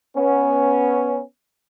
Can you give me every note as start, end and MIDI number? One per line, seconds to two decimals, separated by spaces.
0.16 1.20 59
0.16 1.20 61